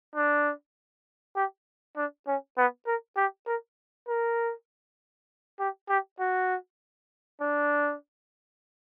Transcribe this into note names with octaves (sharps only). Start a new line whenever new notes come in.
D4
G4
D4
C#4
B3
A#4
G4
A#4
A#4
G4
G4
F#4
D4